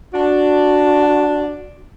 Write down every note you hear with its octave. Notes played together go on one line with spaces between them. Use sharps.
D4 F#4